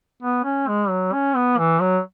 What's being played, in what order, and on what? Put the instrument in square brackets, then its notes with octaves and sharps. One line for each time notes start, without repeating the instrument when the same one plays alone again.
[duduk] B3
C#4
G#3
F#3
C#4
B3
E3
F#3